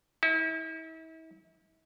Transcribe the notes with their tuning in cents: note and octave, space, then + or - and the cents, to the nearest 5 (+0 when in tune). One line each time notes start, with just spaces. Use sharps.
E4 -40